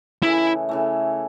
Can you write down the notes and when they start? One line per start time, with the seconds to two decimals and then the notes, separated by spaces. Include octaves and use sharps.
0.22 C#3 E3 A3 E4
0.69 C#3 E3 A3